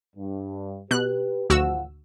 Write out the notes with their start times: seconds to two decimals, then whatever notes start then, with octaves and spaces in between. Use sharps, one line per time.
0.16 G2
0.91 B2 G4 B4 F#6
1.50 G#1 D2 F3 F#4 F#5 E6